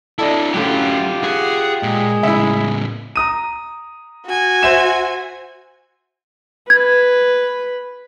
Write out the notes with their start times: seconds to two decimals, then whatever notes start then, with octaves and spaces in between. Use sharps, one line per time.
0.18 D4 E4 A4 D5 D#5
0.54 A2 D3 F#3 C#4 F4 G4
1.24 G#4 F#5
1.83 A#2 G#3
2.23 A2 C#3 E4 E5
3.16 A#5 D#6 D#7
4.25 F#4 G#5
4.63 C5 E5 E7
6.70 B4 G#6